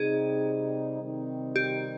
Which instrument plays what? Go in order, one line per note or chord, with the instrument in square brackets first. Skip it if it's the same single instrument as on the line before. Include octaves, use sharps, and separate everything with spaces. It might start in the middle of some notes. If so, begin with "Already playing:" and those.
Already playing: [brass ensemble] C3 G3 C4 D#4 [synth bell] G#4
[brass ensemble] C3 D#3 G3 C4 D#4
[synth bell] G4